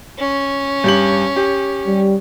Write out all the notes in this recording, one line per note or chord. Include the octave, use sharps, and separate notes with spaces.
C#4
G2 G4 F#7
G4
G3